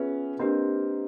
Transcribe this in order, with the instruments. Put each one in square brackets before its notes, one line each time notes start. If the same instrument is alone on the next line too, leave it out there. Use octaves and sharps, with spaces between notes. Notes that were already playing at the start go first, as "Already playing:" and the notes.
Already playing: [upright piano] B3 C#4 [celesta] F4 G#4 B4 E5
[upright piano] A#3 C4 [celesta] D4 G4 B4 D#5